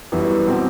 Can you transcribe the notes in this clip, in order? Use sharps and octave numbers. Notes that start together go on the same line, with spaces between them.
F#2 E3 G3 B3
B2 F#3 C4 G4